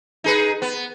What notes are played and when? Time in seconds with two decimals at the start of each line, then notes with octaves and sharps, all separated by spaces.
0.24 D#4 G#4 B4
0.62 B3